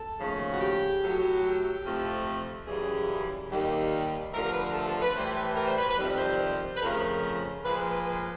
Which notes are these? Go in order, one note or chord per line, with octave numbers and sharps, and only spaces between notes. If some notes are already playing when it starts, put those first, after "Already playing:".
Already playing: A4
D#2 C#3 F3 A3
F#4
G4
A2 F#3 A3
G4
F2 C3 F3 A3
F#2 C#3 E3 G3 G#4
D#2 D#3 G3
G2 D3 F3 A3 A#4
A#4
B4
A#4
A4
A4
B4
A2 E3 G3 C5
B4
A#4
C5
B4
B4
F2 C3 D#3 G3
C5
B4
F2 C#3 F3 A3 A#4
A#2 F3 G#3 B4
B4
B4
B4